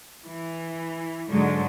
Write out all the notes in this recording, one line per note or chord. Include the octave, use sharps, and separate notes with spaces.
E3
G#2 D3 F#3 G#3